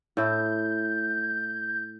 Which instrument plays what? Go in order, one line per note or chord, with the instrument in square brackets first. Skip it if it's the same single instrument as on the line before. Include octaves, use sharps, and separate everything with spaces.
[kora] A2 E4 [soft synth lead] G6